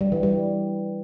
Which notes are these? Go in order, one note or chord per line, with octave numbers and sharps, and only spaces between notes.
G3
E3
G3